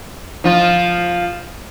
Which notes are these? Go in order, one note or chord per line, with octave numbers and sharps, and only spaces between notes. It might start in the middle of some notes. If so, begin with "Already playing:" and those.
F3 F4